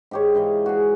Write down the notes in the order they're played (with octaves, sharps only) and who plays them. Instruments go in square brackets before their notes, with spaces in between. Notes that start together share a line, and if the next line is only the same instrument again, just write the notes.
[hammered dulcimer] G#2 G4 C#5
G#2 E3 D#5 F5
F#4 G#4